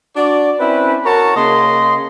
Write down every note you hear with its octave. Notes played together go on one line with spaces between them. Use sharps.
D4 F#4 D5
C4 C#4 E4 B4
F#4 A#4 C#5 A5 A#5
C#3 A#3 D#5 C6